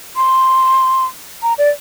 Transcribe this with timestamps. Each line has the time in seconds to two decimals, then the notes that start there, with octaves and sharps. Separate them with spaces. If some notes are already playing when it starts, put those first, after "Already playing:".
0.16 C6
1.43 A#5
1.58 D5